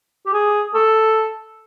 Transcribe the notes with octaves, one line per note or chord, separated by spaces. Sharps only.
G4
G#4
A4